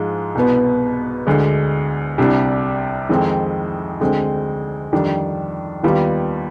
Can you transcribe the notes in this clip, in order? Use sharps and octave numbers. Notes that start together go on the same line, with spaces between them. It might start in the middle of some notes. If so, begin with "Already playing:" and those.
Already playing: G#2 F3 G#3
C2 B2 B3
D2 D3 G#3
C2 C3 G3 D4
F2 D#3 G#3 C4
D2 D3 G#3 C4
F2 D#3 G3 D4
D#2 D#3 G3 B3 F4